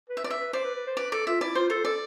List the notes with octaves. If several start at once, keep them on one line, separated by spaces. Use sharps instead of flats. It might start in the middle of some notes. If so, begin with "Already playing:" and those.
B4
E5
B4 D5
E5
B4
C5 D5
B4
B4
C5
B4 D5
A4 D5
F4 E5
E4 D5
F4 C5
A4 C5
A4 D5